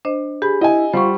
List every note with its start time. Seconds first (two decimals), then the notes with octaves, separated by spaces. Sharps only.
0.05 D4 C5 D#5
0.42 G4 G#4 B5
0.61 E4 D#5 G#5
0.93 G3 F4 C5 F#5 C#6